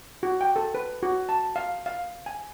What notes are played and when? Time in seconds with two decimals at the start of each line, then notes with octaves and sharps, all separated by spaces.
0.23 F#4
0.41 G5
0.56 A4
0.75 B4
1.03 F#4
1.29 A5
1.56 F5
1.86 F5
2.26 G#5